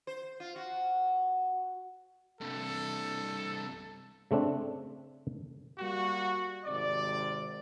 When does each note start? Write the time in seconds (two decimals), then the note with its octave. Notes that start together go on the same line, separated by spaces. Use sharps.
0.07 C5
0.40 F4
0.56 F#4
2.41 C2 G2 A4
4.31 C#3 A3 C4 D4
5.79 G3 A#3 F#4
6.66 G#1 C3 D5